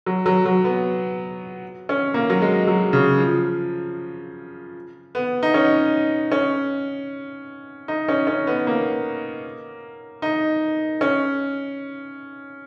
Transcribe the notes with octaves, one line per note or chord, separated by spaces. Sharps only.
F#3
F#3
F#3
B3
C#4
A#3
F#3
G#3
F#3
C#3
F3
B3
D#4
C#4
C#4
D#4
C#4
C#4
B3
A#3
D#4
C#4